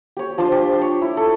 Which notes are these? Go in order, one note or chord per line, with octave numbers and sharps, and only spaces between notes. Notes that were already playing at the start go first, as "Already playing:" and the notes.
G4 C#5
F3 D4 C5 A5
G4
C#5
E4
A4